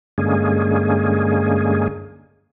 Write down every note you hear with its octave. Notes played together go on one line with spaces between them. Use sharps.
G2 D3 G#3 A#3 C#4 G#4